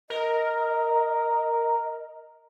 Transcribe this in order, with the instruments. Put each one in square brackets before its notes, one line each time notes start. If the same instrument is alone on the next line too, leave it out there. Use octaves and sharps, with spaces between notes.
[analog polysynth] A#4 [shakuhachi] D#5